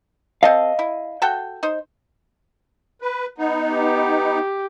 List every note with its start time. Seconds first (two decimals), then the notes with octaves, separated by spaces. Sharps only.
0.43 C4 A4 D#5 F5
0.79 E4
1.22 F#4 A4 G5
1.63 D#4 C5
3.01 B4
3.38 B3 D#4
3.72 G4